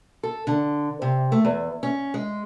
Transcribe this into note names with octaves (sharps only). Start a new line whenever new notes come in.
A4
D3
C3
A3
E2
C#4
G#3